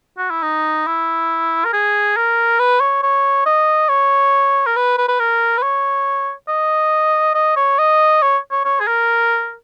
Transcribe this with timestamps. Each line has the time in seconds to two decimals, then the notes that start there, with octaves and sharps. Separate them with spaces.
0.18 F#4
0.30 E4
0.43 D#4
0.87 E4
1.65 A#4
1.73 G#4
2.17 A#4
2.59 B4
2.80 C#5
3.03 C#5
3.46 D#5
3.89 C#5
4.66 A#4
4.76 B4
4.98 B4
5.09 B4
5.20 A#4
5.58 B4
5.62 C#5
6.48 D#5
7.35 D#5
7.56 C#5
7.79 D#5
8.22 C#5
8.51 C#5
8.65 C#5
8.80 G#4
8.87 A#4